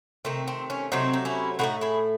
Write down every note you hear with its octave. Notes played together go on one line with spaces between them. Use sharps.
C3 D#3 A3 C4 D#4
C4
C#4
C3 F#3 A3 C4 D#4
D#4
C#4 E4
A2 E3 A3 D#4 F#4
E4 G#4